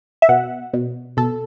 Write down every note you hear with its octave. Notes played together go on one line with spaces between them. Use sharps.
E5
B2 F#5
B2
B2 A4